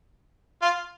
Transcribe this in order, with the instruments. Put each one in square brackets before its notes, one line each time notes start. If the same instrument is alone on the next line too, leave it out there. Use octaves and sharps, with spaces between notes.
[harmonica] F4